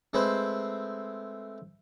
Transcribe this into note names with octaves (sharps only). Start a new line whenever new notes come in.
G#3 A3 C4 B4 C5